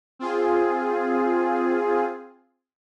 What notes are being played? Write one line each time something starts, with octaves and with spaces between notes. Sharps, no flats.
C4 F4 G#4